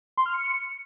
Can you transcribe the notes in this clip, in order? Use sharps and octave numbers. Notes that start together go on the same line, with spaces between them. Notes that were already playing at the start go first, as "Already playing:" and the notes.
C6
F6
C#7